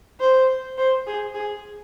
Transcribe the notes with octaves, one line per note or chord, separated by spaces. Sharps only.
C5
C5
G#4
G#4